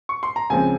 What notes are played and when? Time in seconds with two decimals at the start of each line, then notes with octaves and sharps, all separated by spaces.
0.09 C#6
0.23 C6
0.36 A#5
0.50 C#2 C#3 F3 C4 G#5